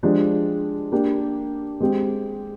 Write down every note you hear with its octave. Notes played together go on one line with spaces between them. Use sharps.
F3 G#3 D4 G4
A#3 D4 G4
G#3 C4 G4